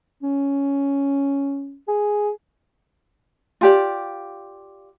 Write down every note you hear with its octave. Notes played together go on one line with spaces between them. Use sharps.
C#4
G#4
F4 G4 D5